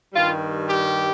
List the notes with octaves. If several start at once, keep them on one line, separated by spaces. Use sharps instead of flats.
G2 D#3 G3 F4
G4